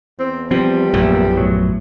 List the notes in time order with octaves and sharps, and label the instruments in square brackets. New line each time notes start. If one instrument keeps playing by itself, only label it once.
[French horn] E2 [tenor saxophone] C4
[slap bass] F3 [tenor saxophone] G3 [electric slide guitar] C4
[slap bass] A#1 F#2 F3 [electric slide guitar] A#2 A3 A#3
[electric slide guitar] A2 F#3